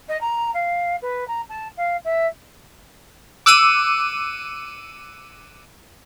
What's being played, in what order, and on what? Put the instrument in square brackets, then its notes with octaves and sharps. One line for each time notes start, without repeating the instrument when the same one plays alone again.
[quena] D#5
A#5
F5
B4
A#5
A5
F5
E5
[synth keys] D6 E6 F#6 C#7 D#7